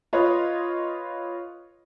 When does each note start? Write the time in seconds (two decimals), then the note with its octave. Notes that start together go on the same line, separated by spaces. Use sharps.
0.13 F4 B4 C#5 D#5